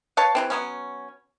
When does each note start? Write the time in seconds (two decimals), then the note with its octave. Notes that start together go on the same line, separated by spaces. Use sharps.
0.17 B4 C#5 F5 A5
0.35 C3 E3 C4
0.50 F#3 B3 C#4